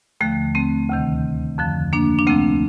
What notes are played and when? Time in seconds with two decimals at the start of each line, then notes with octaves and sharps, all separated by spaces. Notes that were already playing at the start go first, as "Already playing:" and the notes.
0.21 D#2 D3 F3 A3
0.55 A3 C4
0.89 D2 C3 D#3
1.58 F2 D3 F3
1.93 A#3 D4
2.19 D4
2.27 D2 C3 F3 A3 C4